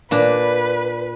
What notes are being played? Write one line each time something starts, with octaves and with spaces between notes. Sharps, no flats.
A#2 D4 B4